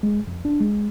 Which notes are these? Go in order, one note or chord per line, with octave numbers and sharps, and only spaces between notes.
G#3
F2
D4
G#3